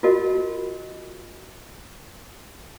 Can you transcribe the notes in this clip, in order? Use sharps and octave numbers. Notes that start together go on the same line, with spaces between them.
F4 F#4 A#4 D#5